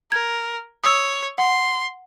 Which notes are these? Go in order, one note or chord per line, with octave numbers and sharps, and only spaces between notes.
A#4 G#6
C#5 D#6 E6
F#5 C6